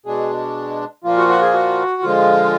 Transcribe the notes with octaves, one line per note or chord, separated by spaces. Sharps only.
B2 G#3 D4 G#4
A#2 F3 A#3 F4
F#4
F#4
G#4
F#4
D3 F3 G#3 F4